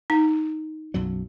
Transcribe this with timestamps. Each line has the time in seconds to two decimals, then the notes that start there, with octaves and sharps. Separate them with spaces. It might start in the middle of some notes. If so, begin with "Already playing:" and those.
0.10 D#4
0.94 B1 F#2 F#3